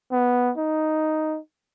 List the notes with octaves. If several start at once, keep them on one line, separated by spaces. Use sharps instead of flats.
B3
D#4